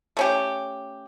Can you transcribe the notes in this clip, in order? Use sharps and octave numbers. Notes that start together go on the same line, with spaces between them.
A3 C#4 G4